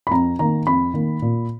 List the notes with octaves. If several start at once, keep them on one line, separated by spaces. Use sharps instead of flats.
B5
F2 A#5
D#3 A#3 A#5
F2 B5
D#3 A#3
A#2